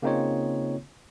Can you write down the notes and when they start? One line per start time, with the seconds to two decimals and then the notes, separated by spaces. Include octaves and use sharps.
0.02 C#3 A#3 C4 D#4 F4 C#5